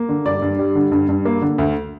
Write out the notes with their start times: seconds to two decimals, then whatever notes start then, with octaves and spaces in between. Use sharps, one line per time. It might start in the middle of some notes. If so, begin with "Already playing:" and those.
Already playing: A#3
0.09 D3
0.25 G2 D5
0.42 G2
0.59 G3
0.75 D3
0.92 G2
1.09 G2
1.25 A#3
1.42 D3
1.58 D2